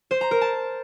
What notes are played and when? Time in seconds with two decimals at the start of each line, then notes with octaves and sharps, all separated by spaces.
0.11 C5
0.21 A#5
0.31 A#4
0.41 A5